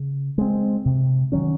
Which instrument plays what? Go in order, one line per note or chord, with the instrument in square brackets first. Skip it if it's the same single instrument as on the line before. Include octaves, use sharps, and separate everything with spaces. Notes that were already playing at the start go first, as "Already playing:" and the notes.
Already playing: [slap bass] C#3
G#3 C4
C3
D#3 F#3 C#4